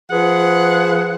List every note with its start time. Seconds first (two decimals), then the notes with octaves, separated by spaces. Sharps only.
0.10 F3 G#4 B4 F#5